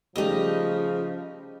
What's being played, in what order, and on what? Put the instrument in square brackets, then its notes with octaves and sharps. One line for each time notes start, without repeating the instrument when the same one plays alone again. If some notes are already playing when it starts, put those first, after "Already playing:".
[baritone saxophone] C#3 [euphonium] F3 [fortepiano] G3 A3 G4 [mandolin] D#4 D#5